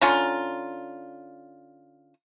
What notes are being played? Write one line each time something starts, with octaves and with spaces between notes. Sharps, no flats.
D3 C#4 F4 A#5